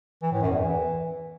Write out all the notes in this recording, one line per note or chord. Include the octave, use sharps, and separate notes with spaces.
E3
A2
F#2
E2
E3